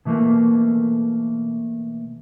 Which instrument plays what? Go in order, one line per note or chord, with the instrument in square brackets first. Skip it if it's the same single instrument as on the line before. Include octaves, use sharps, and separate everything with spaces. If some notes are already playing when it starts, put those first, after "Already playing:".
[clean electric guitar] B2 E3 A3 A#3